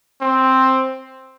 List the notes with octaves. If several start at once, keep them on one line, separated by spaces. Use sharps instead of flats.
C4